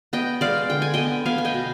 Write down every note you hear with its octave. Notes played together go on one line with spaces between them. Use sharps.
B3 D#5 G5
G#3 D5 F5
D3 G5
G#5
B3 D#5 G5
B3 F5 G#5
G#5
D#5 G5
B2